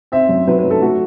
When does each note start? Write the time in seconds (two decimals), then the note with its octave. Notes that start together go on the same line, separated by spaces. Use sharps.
0.12 C4 E5
0.29 F#2
0.47 F#3 B4
0.59 B4
0.64 F#2
0.70 A4
0.81 A3 F#4